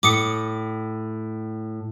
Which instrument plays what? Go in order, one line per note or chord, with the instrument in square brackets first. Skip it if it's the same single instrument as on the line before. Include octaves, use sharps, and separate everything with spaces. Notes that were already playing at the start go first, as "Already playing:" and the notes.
[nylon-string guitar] A2 [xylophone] D6 D#6 C#7